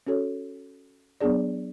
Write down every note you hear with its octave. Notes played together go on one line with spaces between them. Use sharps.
C#4 F#4 A4 C#5
F#3 B3 D4 G#4 D5